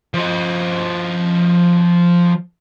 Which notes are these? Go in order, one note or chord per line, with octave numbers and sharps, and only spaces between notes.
F3 D#5